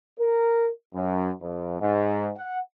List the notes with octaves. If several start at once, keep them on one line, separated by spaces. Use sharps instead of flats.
A#4
F#2
F2
G#2
F#5